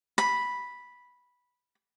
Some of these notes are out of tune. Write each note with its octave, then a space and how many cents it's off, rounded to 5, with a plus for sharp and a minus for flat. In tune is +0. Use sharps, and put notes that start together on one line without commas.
B5 -5